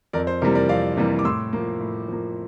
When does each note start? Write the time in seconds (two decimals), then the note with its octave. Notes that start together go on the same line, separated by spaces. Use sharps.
0.13 F2 A#4 D5
0.27 C5
0.42 C3 E3 G3 A#3 A#4
0.55 A#4 D5
0.69 F2 D5 F5
0.97 C3 E3 G3 A#3
1.19 D6
1.25 A2 C6 E6
1.53 F3 A#3
1.80 A2
2.08 F3 A#3